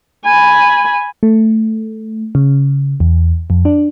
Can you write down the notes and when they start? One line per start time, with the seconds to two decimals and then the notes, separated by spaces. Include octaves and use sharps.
0.25 G#5 B5
1.23 A3
2.35 C#3
3.00 E2
3.50 F2
3.65 D4